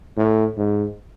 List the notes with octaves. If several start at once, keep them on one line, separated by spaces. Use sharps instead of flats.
A2
G#2